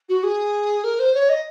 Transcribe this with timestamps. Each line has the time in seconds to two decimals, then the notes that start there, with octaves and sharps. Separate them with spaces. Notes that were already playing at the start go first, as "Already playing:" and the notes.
0.08 F#4
0.23 G#4
0.84 A#4
0.99 C5
1.14 C#5
1.29 D#5